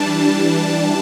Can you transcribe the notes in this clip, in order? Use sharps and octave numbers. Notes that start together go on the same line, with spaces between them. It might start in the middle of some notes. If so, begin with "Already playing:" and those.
Already playing: E3 G3 D4 A5